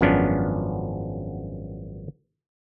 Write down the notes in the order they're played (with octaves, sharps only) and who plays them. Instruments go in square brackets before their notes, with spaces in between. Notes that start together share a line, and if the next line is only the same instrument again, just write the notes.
[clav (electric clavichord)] G#1 F#2 F3 B3 C#4 D4